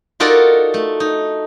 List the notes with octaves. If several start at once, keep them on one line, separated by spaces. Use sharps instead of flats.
D#4 F4 F#4 A4 A#4 D5
A3
D#4